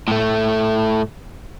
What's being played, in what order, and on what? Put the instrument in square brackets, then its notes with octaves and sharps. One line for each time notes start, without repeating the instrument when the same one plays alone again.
[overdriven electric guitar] A2 A3